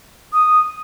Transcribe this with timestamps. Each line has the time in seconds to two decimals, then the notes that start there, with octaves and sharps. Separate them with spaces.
0.33 D#6